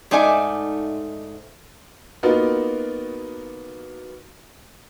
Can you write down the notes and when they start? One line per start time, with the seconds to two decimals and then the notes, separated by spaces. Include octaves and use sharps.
0.11 G#2 A3 D#4 D5 G#5
2.23 A#3 B3 D#4 F4 F#4 A#4